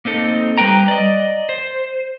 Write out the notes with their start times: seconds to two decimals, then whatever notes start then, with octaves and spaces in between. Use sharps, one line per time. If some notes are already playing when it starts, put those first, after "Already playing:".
0.05 A#3 C4 D#4 A4
0.58 G3 A3 B4 G5 A#5
0.88 D5 D#5
1.49 C5